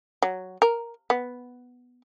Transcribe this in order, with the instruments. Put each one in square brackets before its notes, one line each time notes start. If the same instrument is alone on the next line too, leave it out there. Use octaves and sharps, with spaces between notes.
[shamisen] F#3
A#4
B3